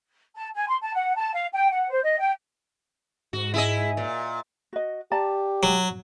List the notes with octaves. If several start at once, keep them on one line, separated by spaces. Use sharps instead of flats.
A5
G#5
C6
A5
F#5
A5
F5
G5
F#5
C5
D#5
G5
G#2 F#4
E4 G#4 D#5
A#2
F#4 D#5
G4 D5 A5 A#5
F#3